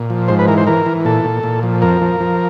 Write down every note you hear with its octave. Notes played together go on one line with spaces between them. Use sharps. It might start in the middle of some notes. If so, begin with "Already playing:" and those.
Already playing: A#2
F3
G#2 C5
B4
E3 A#4
C5
E3 A#4
E3
A#2 A4
A#2
A#2
F3
F2 A#4
F3
F3